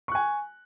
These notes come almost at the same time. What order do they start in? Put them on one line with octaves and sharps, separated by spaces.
C#6 F#6 G#5